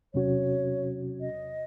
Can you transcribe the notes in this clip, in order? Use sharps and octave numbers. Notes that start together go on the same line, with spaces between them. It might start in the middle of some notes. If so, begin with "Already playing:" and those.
E2 C3 F#3 C#4 F#4 C#5
D#5